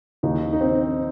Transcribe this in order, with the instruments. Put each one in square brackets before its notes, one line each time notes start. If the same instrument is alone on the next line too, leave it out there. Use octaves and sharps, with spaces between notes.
[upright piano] D#2 D#3 D#4
D#4
C4